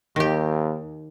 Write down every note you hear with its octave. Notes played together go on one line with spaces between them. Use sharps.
D#2 D#3 G4